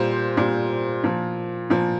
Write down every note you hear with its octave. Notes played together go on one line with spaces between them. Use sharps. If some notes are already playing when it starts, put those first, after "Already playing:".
Already playing: A#2 G3 C5
A#2 G3
A#2 F3
A#2 F3